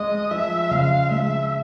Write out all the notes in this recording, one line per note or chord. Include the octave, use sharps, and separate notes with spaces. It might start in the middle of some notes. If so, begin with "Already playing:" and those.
Already playing: G#3 D#5
F3 E5
C#3 F5
G#3 E5